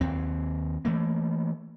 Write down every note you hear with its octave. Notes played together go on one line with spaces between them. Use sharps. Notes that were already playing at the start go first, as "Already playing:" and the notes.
D#2 C4
E3 A3 A#3